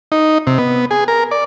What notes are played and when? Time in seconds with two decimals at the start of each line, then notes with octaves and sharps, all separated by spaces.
0.12 D#4
0.47 C3
0.58 B3
0.91 G#4
1.08 A#4
1.31 D5